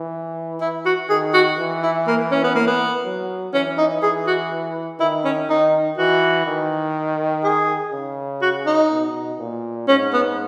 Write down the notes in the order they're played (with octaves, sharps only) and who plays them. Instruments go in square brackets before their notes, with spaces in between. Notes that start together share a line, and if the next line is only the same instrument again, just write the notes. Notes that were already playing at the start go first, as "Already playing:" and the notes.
Already playing: [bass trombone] E3
[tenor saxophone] E4
F#4
[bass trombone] D#3 [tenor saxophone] G#4
[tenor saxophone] F#4
[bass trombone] E3
[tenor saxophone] E4
A#3
C#4
B3
A#3
B3
[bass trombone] F#3
[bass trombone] E3 [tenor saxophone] C#4
[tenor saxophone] D#4
[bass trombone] E3 [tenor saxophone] G#4
[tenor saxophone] F#4
[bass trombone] D#3 [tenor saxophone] E4
[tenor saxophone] C#4
[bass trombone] D#3 [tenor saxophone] D#4
[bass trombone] E3 [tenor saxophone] F#4
[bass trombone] D#3
[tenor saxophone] G#4
[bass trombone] C#3
[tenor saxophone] F#4
D#4
[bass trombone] B2
A#2
[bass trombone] G#2 [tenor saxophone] C#4
[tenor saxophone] B3